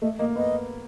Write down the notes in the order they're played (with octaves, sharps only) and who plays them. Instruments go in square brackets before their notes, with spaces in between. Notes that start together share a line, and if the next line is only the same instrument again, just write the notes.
[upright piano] A3 [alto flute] D#5
[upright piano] A#3 [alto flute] D#5
[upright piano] B3 [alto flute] D#5